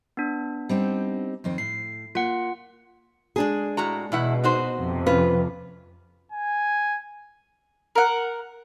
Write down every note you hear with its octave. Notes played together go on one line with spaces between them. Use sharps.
B3 D4
G3 C4 D#4
F2 D#3 C4
A2 C7
A#3 F4 F#5
G#3 D4 G#4
A2 F#4 A#5
E2 B2 E4 F#5
D#4 F#4 C5
F2 C3
C#4 F4 B4
G#5
A#4 F#5